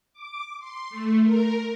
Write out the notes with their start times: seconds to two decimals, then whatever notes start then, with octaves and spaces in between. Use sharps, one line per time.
0.13 D6
0.59 C6
0.90 A3
1.24 A#4